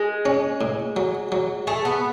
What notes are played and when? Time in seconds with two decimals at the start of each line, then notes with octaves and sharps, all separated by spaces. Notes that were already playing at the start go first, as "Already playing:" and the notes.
Already playing: G#3
0.25 C#4
0.61 A2
0.96 F#3
1.32 F#3
1.67 A3 G#4
1.85 B3